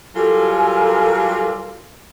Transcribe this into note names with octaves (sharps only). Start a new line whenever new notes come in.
F#3 G3 F4 A4 A#4 G#5